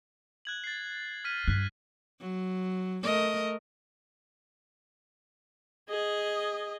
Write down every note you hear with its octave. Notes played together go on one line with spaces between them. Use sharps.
F#6 G#6 F#7
A6 C7
F6 B6 D#7
G2 F#6 B6
F#3
A3 A#4 D#5
G#4 D#5